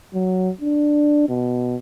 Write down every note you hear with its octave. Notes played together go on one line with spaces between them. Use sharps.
F#3
D4
B2